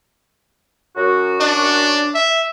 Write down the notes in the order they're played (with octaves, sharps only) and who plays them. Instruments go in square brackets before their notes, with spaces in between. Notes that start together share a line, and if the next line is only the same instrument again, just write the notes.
[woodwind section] F#2 F#4
[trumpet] D4
E5